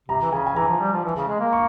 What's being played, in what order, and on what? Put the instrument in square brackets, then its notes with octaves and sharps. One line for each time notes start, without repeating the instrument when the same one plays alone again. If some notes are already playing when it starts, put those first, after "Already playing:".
[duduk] C3 [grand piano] A#5
[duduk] E3
[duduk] C#3 [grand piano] G#5
[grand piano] G#5
[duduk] E3 [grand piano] A#5
[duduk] F3
G3
F3
E3
C#3
G#3
A#3
[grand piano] C#6